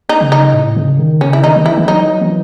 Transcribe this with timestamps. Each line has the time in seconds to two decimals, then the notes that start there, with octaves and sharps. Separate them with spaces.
0.09 D#4
0.21 C#3
0.32 D#4
0.54 A2
0.76 C#3
0.99 D#3
1.21 C#3 C#4
1.33 E4
1.44 D#3 D#4
1.56 D#3
1.66 E3 E4
1.78 E3
1.88 F#3 D#4
2.22 E3